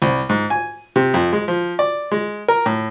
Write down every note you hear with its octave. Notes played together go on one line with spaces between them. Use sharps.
C2
G#2
G#5
C3
F2
G#3
F3
D5
G#3
A#4
A2